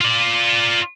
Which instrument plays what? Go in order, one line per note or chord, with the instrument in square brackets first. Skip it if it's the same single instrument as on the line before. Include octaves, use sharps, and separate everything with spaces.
[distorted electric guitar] F4 D5